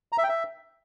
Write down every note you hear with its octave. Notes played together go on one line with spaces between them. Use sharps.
A#5
E5
G5
E5